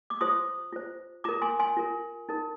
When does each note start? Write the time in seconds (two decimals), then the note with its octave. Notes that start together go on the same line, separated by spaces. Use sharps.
0.10 D6
0.21 F4 C5 C6 D#6
0.72 F4 C5
1.24 F4 A#4 A#5 D6
1.42 G#5 C6
1.59 G#5 C6
1.77 F4 A#4
2.29 D#4 A#4